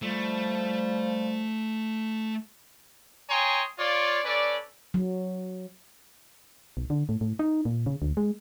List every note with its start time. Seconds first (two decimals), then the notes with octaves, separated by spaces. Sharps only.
0.02 F3 G3 A3
3.30 C#5 G5 G#5 A#5 C6 D#6
3.79 F4 C#5 D5
4.25 C#4 A4 B4 D5
4.94 F#3
6.77 B1
6.90 D3
7.09 A2
7.21 A2
7.39 D#4
7.65 A#2
7.86 C#3
8.02 D2
8.17 G#3